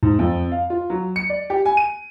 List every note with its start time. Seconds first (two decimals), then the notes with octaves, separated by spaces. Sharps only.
0.03 G#2
0.19 F2
0.52 F5
0.70 F4
0.90 F#3
1.16 C#7
1.30 D5
1.50 G4
1.66 G#5
1.77 D#7